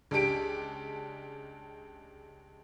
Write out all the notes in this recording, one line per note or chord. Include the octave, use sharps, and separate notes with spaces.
C#2 D4 G4 D7